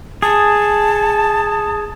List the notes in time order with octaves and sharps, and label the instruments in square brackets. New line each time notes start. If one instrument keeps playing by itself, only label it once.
[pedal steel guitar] G#4 [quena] A5